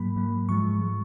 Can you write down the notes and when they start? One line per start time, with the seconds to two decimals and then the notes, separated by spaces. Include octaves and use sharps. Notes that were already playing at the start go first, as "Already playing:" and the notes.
Already playing: G#2 F#3 A#3 B5
0.16 G#2 F#3 A#3
0.49 G#2 F3 G#3 C#6
0.81 F3 G#3